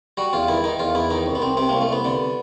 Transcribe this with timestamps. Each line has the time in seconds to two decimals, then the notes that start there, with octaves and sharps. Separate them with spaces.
0.17 G3 F#4
0.33 E2 F4
0.48 D#3 E4
0.64 D#3 D#4
0.79 E2 F4
0.95 E2 E4
1.10 D#3 D#4
1.26 C2
1.35 B3
1.42 C2 C4
1.57 C3 C4
1.69 C2 A#3
1.81 A3
1.89 C2 B3
2.05 D3